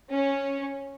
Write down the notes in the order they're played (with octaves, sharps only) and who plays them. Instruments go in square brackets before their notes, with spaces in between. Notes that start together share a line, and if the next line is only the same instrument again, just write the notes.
[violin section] C#4